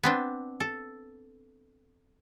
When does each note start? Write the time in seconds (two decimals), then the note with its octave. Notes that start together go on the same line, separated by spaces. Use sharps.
0.03 B3 C4 D4
0.60 A4